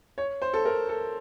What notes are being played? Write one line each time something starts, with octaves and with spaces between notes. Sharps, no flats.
C#5
C5
A4
A#4
A4